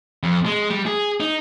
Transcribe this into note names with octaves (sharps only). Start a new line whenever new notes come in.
F2
G#3
G3
G#4
D#4